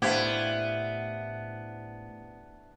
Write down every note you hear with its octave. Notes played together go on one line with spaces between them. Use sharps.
A2 B3 D4 E4 G4 C5 E5 F5